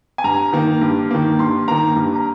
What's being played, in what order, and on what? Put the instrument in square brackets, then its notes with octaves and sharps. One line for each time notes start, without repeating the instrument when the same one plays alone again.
[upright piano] G#5
G2 A#5
D#3 A#3
G2
D#3 A#3
G2 C6
D#3 A#3 A#5
G2
A#5